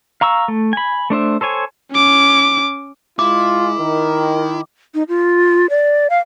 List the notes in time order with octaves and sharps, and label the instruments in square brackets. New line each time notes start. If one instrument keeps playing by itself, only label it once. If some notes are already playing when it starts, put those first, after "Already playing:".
[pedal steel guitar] F5 A#5 C#6 E6
A3
G#5 B5
A3 D4 C5 E5
A4 C5 C#5 G#5
[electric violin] C#4 D6
[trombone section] G#3 [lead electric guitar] E4 [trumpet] F4 [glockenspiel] D6
[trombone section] D#3 [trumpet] A#4
[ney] D#4
F4
D5
F5